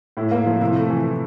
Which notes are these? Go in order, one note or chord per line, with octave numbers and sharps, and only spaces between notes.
A2 E4
A#3
F3
C3 E4
A3
E3